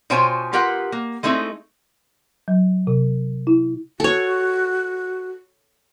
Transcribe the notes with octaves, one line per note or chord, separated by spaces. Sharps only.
B2 F4 C5 C#5 G5 G#5
B3 F4 G4 A#4 B4 F#5
A#3
G#3 A3 C4 D#4 E4
F#3
C3
E4
F#4 A4 C#5